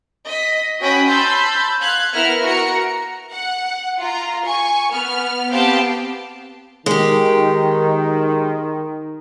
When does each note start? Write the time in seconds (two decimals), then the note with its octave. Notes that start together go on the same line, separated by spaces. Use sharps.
0.26 D#5 B6
0.79 C#4 F#4 G5 B5 D#6
1.08 A5 B5 C6 E6 G6 A6
1.79 F5 F#6 G#6
2.13 B3 E4 A#4 E5 F6 C#7
2.42 F#4 A#4 F#5 C#7
3.32 F#5
4.00 F4 A#5
4.45 G#5 C#6
4.92 B3 F6
5.50 B3 C4 G4 F5 G5 A5
6.86 D#3 G#3 G4